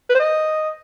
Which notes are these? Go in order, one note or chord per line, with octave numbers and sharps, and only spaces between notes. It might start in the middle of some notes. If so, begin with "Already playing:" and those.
B4
C5
D#5